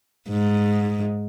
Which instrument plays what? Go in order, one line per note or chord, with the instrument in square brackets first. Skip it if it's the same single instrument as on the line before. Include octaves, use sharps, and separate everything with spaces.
[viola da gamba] G#2